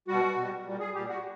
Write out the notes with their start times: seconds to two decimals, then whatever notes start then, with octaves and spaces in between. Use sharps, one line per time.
0.08 B2 G3 F#4
0.37 B2
0.42 G3
0.66 A#2 G3
0.80 G#4
0.94 A#2 G3 G4
1.08 F#4